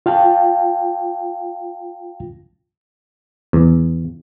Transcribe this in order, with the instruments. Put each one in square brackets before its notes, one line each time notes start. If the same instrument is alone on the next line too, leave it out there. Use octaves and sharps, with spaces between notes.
[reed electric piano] F4 F5 G5 A5
[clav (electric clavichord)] E2